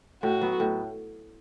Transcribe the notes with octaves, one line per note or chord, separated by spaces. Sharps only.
A2 F#4
F#3 B3
A2